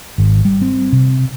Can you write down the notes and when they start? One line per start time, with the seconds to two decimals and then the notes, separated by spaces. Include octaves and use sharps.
0.18 G#1
0.45 G3
0.62 C4
0.92 C3